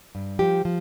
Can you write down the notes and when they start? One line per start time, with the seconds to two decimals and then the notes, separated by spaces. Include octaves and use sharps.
0.15 G2
0.39 F3 G4
0.65 F3